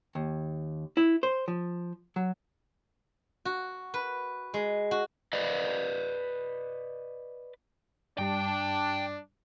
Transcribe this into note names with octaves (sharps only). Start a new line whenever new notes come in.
D#2
E4
C5
F3
F#3
F#4
B4
G#3
F#4
B4 D5 D#5
G2 G3 D4 G5